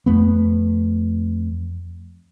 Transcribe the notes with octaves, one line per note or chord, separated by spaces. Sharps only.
F2 A3 B3